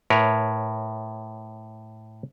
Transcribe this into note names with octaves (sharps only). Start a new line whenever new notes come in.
A2 A#4 B4 C#5